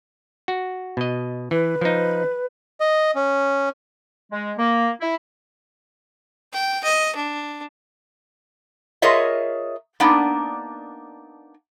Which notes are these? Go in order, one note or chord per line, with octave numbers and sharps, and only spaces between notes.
F#4
B2 D#5
E3 B4
F3 D#4
D#5
C#4
G#3
A#3
E4
G5
D#5
D4
F4 G#4 A#4 C#5 D#5 E5
A#3 B3 D4 D#4